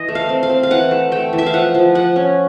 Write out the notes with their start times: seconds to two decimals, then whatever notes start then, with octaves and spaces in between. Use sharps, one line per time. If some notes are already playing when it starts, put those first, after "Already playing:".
Already playing: E3 D#5
0.08 A3
0.15 F5
0.29 C4
0.43 F5
0.49 C4
0.63 F5
0.71 E3 F#5
0.91 A3
1.12 A3 G5
1.33 E3
1.38 E5
1.46 F5
1.53 F3 F#5
1.75 F3
1.95 F3 F#5
2.16 C#4